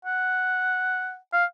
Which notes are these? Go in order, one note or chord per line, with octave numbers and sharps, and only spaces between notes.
F#5
F5